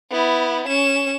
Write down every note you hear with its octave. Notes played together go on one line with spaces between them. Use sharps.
B3 E4
C#4 E7